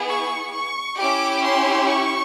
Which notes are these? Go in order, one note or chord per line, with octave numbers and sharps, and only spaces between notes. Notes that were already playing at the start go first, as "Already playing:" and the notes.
Already playing: B3 E4 G#4
C#6
C#6
C#4 E4 G4 D6
C6
C#6